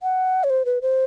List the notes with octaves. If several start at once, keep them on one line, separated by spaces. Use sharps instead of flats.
F#5
C#5
C5
B4
C5